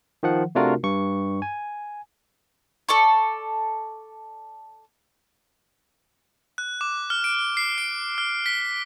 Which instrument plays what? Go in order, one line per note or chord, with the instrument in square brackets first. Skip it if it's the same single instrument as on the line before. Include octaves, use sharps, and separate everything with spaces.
[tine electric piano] D#3 F3 F#5
C3 A3 D4 F4 F#4 A#4
G2 C#6
G#5
[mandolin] A4 D5 C#6
[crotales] F#6
D6
F6
D7
C7
D7
F6
B6